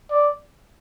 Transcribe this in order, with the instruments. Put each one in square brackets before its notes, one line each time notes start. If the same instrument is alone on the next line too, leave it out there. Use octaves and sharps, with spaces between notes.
[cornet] D5